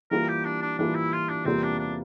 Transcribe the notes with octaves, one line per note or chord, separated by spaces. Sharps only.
E3 G3 A#3 F4 A#4
G4
D4
D4
E3 G3 A#3 D4 F4
E4
F4
D4
E2 C3 G3 A#3 C4 F4
D4
D4